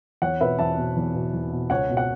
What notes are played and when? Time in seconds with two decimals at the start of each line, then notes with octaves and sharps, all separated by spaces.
0.22 E2 C#5 F#5
0.41 B2 B4 E5
0.59 E2 E5 A5
0.77 B2
0.97 E2
1.14 B2
1.34 E2
1.52 B2
1.70 C#2 C#5 F#5
1.89 B2
1.97 F#5